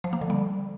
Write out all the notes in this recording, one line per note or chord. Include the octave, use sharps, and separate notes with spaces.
F3
A#3
D3
G3